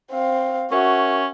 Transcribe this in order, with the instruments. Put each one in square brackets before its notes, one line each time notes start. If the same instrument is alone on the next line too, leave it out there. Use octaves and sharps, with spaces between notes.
[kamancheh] C4 F5
[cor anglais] C#4 [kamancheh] F#4 [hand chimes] A#4 E5